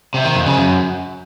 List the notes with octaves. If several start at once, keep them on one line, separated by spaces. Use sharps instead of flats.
C3
D#3
F2
C#3
F#2